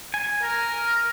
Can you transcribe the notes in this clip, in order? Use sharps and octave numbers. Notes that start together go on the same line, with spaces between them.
G#5
A#4